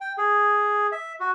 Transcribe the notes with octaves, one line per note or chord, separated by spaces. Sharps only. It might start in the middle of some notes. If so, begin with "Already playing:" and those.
G5
G#4
E5
F#4